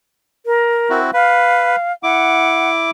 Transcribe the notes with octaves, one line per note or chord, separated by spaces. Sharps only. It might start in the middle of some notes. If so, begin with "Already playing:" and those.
A#4
C4 E4 F#4
B4 F5
E4 F#5 D6